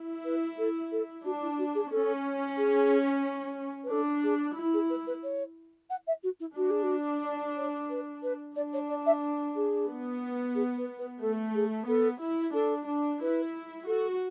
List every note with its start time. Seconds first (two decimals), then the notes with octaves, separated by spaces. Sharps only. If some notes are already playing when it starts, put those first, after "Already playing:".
Already playing: E4
0.25 B4
0.58 A4
0.92 A4
1.25 D4 F#4
1.42 E4
1.58 F#4
1.75 G#4
1.91 C#4 A4
2.57 G#4
3.84 B4
3.91 D4 A4
4.23 G#4
4.57 E4
4.73 G#4
4.89 B4
5.07 B4
5.23 C#5
5.90 F#5
6.07 E5
6.23 F#4
6.39 E4
6.56 D4 F#4
6.70 G#4
6.82 F#4
7.23 D5
7.56 C#5
7.90 B4
8.22 B4
8.55 D4 D5
8.73 C#5
8.89 D5
9.06 E5
9.55 G#4
9.88 B3
10.55 G#4
10.77 B4
10.98 B4
11.21 A3 A4
11.54 G#4
11.88 B3 A4
12.20 E4
12.53 D4 A4
12.87 D4
13.20 E4 B4
13.86 F#4 A4